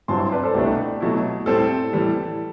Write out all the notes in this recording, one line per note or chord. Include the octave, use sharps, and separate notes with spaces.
G2 F#3 C4 E4 A5 C6
A5 C6
B4 D5
A4 C5
C2 B2 A3 D4 G4 B4
B2 F#3 A3 E4
A2 G3 C4 A4
A2 E3 G3